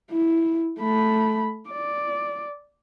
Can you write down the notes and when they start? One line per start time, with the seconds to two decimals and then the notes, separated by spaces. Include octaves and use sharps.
0.11 E4
0.80 A3 B5
1.70 D5